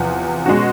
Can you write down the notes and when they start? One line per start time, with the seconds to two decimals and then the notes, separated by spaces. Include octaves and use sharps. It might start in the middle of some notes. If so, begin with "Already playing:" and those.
Already playing: E2 C3 F3
0.46 B2 G#3 C#4 F#4